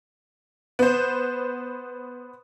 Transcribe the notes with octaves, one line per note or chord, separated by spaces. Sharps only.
B3 C5